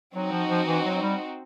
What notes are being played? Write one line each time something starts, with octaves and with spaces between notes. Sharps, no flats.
F#3 C4 D#4 F#4
F3
F3
E3
F#3
G3